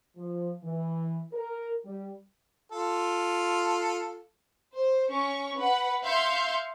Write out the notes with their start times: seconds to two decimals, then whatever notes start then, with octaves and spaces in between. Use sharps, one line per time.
0.16 F3
0.63 E3
1.33 A#4
1.84 G3
2.72 F4 A4
4.74 C5
5.10 C#4 C#6
5.58 B4 F#5 B5
6.03 E5 F5 C6 G6 C#7